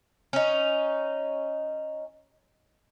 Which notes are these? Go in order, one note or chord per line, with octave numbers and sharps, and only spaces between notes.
C#4 D#4